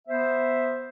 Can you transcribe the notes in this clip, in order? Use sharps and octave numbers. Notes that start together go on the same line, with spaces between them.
B3 C5 E5